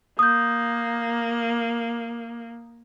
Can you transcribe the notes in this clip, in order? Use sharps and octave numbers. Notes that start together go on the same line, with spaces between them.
A#3 D#6 G6